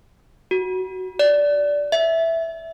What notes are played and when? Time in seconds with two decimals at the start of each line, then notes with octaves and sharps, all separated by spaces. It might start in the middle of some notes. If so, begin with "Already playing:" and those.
0.51 F#4
1.19 D5
1.92 E5